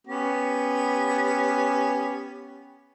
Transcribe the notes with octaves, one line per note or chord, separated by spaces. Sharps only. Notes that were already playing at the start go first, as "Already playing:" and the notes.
B3 C#4 G4